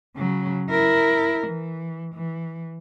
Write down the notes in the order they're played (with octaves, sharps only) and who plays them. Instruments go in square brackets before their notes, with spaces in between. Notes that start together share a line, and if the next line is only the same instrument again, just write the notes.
[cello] C#3 F#3
E4 A#4
E3
E3